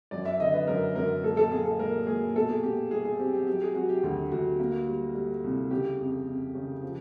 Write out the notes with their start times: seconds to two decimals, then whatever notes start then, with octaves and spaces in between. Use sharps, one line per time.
0.11 F#2 D5
0.25 E5
0.40 D3 D#5
0.54 B4
0.67 F#2 A#4
0.95 F#2 A#4
1.23 A#2 A4
1.37 A4
1.51 A#3 G#4
1.65 A4
1.79 A#2 A#4
2.07 A#2 G#4
2.35 B2 A4
2.49 G#4
2.63 B2 G4
2.91 G3 G#4
3.05 G#4
3.19 C4 G4
3.33 G4
3.47 F#3 G4
3.62 G#4
3.75 F#3 F#4
3.89 G4
4.03 D2 F#4
4.32 D2 F#4
4.59 A#3
4.87 G3
5.15 G3
5.44 C2
5.71 C#3 G4
5.99 F2
6.27 F2
6.55 C#3
6.83 F3